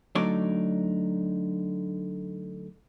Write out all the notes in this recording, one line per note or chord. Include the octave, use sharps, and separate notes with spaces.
D3 F#3 A3 D#4 C#5 D5